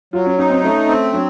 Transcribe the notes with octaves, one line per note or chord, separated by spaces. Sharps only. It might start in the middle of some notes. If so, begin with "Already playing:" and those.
F#3 F4
C#4
C#4 D#4
C4
A3 C#4
C4
F#3 D4